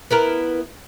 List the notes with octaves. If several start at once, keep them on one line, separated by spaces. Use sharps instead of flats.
B3 E4 A#4